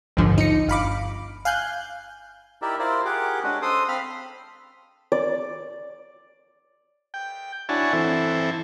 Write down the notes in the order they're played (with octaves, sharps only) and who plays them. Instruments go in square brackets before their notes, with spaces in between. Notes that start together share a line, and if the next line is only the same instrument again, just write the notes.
[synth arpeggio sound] A#1 D#2 G#2 D3 F3
D#4 C#7
G1 F5 B5 D6
F5 G#5 F#6 G6
[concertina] D#4 E4 G4 A#4 D5 E5
E4 F4 A#4 C5 D5
G4 G#4 A#4 F#5 D6
G#3 C#4 D4 F#4
A4 C5 C6 D#6
C4 F5 B5 F6
[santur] D5
[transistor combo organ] G5
D4 E4 F#4 C#5 G#5 A5
E3 C4 E4 A4